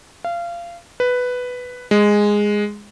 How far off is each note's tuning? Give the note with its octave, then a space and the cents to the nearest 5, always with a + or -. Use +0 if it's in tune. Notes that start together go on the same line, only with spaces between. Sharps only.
F5 -25
B4 +5
G#3 -5